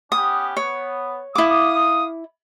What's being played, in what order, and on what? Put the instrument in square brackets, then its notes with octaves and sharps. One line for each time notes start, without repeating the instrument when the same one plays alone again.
[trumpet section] B3 C#4 G4 [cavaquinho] D#6
[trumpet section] B3 [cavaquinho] C#5
[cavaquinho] E4 D6 [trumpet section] F5 D#6